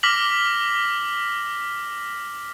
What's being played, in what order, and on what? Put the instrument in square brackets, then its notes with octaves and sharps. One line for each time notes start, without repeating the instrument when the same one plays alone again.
[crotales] D6 F6 A#6 B6 F#7